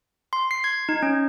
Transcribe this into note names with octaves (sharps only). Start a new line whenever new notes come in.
C6
C7
G#6
D#4
C#4